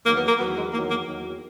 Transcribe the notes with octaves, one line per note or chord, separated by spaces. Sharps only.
E2 D#3 F#3 A#3
B3
A#3
E2 D#3 F#3 B3
G#3
E2 D#3 F#3 A#3
A#3
E2 D#3 F#3